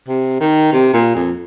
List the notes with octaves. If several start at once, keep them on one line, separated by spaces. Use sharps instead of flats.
C3
D#3
C3
A#2
F2